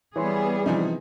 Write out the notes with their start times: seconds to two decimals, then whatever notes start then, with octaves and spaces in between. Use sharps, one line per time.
0.16 E3 G3 B3 G#4 C#5 C6
0.66 C3 E3 F3 D#4